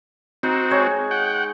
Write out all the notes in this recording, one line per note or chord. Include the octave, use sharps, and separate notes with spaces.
C4 D#4 F#4
G#3 C#5
F#5 G5